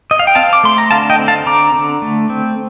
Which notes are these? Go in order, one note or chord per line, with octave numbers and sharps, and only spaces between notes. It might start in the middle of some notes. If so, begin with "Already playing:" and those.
D#5
F5
G5
C4 F5 A5
D6
A3 C6
A#5
D3 F5 A5
D#5 G5
C4
F5 A5
D3 A#5 D6
D3
A3
C4